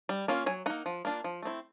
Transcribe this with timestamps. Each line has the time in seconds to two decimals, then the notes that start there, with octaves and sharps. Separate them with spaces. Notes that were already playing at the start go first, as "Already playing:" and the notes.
0.09 G3
0.28 A#3 C#4 F4
0.46 F#3 G#5
0.66 A#3 D#4 F#5
0.86 F3
1.05 A#3 D4 F4
1.24 F3
1.42 A3 C4 E4